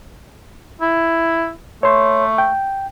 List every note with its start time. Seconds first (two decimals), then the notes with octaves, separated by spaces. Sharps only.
0.81 E4
1.83 A3 C#5 C6
2.38 G5